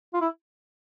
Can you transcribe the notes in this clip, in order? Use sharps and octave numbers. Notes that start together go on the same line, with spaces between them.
F4
E4